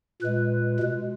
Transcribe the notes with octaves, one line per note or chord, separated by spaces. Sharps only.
A#2 G#3 B4
B2 G#3